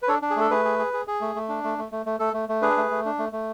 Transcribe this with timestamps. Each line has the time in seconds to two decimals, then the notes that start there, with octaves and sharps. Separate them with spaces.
0.02 B4
0.08 D4 A4 C#5
0.22 D4
0.31 G#4
0.36 A3 A4
0.51 A3 G#4 B4
0.65 G#4
0.79 G#4
0.93 G#4
1.07 G#4
1.21 A3
1.35 A3
1.49 D4
1.64 A3
1.78 A3
1.92 A3
2.06 A3
2.19 A3 A4
2.34 A3
2.49 A3
2.62 D4 G#4 B4
2.77 A3
2.91 A3
3.05 D4
3.19 A3
3.32 A3